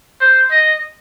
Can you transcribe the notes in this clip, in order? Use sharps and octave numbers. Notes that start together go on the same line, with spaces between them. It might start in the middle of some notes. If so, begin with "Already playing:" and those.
C5
D#5